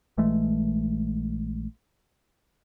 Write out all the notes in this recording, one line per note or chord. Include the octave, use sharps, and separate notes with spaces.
A#1 E3 G#3 A3